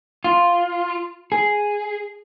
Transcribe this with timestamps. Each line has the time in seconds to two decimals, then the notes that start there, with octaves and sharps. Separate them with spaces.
0.24 F4
1.32 G#4